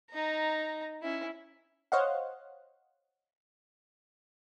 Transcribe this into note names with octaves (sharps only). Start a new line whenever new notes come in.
D#4 A#5
C#4 E4
C5 C#5 D#5 F5 F#5